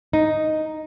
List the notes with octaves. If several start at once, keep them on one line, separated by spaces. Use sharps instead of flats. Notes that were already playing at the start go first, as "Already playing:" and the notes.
D#4